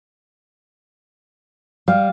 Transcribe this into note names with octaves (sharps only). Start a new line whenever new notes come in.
G3 F5